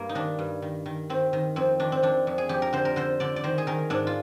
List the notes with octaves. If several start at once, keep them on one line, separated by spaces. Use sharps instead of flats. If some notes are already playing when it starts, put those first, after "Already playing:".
Already playing: G2 A#3
D#4
D#3 D4
G2
D#3
D#3
D#3 C4
D#3
F2 C4
D#3 D4
C4
F2 D4
F2
G#4
F2 G4
A#4
D3 C5
A#4
D3 C5
D3 D5
D5
D#3 C5
G#4
D#3 A#4
G#2 D4
F4